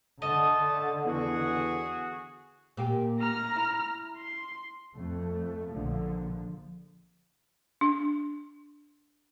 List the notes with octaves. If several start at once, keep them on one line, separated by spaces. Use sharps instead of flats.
D3 A3 A4 D#5 A5
E2 F#4 G#4
A#2 A#3 G4
A#5 F6
E4
C6
F2 A3
A#1 A#2 D3 F3
D4